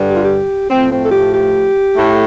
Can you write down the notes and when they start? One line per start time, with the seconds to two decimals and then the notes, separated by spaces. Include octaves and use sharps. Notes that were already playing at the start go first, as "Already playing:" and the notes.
Already playing: G2 D3 G3
0.09 G4
0.16 F4
0.24 G4
0.70 A2 F3 A3 C4
0.91 C4
1.04 A4
1.12 G4
1.33 G4
1.96 A2 A3